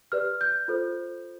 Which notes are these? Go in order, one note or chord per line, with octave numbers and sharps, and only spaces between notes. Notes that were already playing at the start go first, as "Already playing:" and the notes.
G4 B4 D5 F6
G6
F4 A4 C5